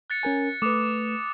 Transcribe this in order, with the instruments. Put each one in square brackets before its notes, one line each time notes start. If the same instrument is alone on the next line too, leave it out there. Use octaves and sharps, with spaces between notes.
[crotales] F#6 A6 C#7
[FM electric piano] C#4 A#4 G#5
[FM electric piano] A3 B4 [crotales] D6 D#6